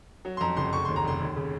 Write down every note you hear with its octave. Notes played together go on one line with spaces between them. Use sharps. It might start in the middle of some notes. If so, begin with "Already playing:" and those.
F#3
C6
F2 A#5
F#1 C6
F1 C#6
D#2 C6
A#5
F1 C6
D#2
C#3